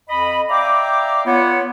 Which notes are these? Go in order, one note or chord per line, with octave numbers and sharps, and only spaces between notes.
F2 D#5 B5
D5 E5 F5 G5 A#5 D6
B3 F4 C#5 F#5